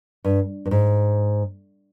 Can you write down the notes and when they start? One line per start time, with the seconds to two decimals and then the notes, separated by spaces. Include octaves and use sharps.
0.24 G2
0.65 G2
0.71 G#2